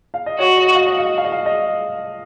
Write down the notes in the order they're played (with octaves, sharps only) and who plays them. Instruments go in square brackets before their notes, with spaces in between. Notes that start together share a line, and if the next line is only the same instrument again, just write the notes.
[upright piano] F5
D#5
[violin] F#4 [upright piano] C#5
[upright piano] D#5
F5
D#5
F5
F5
D#5
F5
D#5